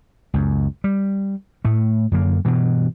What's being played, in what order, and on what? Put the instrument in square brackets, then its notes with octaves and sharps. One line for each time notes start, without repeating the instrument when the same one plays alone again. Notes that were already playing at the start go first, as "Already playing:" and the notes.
[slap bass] C#2 F#2
G3
A2 A3
F#2 D3 A#3
G2 B2 E3